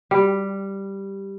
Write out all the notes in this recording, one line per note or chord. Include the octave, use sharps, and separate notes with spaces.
G3